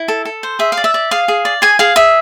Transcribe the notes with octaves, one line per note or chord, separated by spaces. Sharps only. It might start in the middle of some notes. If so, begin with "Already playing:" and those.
Already playing: E4
A4
A4
C5
G#4 E5
F5
D5
E5
D5
G#4 F5
G#4
D5
G#4 G#5
G#4 F5
G#4 E5